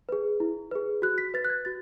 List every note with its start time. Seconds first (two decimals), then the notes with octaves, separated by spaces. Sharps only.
0.09 G#4 B4
0.40 E4
0.71 G#4 B4
1.02 F#4 F#6
1.18 B6
1.34 B4 A6
1.45 F#6
1.50 G#6
1.65 F#4 A6